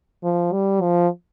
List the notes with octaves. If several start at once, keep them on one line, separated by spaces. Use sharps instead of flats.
F3
G3
F3